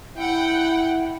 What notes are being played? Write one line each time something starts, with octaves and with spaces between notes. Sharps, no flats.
E4 F#5 G5